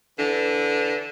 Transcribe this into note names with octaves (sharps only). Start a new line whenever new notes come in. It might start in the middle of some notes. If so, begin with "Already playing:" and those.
D3 E3